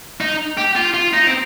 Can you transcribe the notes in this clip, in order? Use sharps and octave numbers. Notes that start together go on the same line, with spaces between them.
D#4
G4
F4
F4
D#4
C4